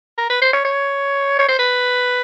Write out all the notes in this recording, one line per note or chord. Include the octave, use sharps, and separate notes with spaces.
A#4
B4
C5
C#5
C#5
C#5
C5
B4